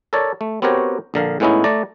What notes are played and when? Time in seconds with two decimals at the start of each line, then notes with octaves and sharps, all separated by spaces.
0.13 A4 A#4 C#5 D5
0.41 A3
0.62 B3 C4 F#4 G4 A#4 C#5
1.14 A#1 D3 A#4 F5
1.40 A2 G#3 B3 C#4 D#4 E4
1.64 A3 D5 A#5